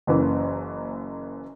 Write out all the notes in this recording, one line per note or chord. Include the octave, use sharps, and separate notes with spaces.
F#1 F#2 E3 A#3